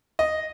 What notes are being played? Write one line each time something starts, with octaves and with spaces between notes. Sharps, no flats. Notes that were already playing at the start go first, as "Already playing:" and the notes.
D#5